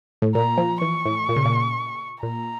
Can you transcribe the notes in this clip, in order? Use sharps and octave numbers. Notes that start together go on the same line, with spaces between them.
A2
A#2 A#5
F3
E3 C#6
A2
A#2
C#3
A#2
A#2 A#5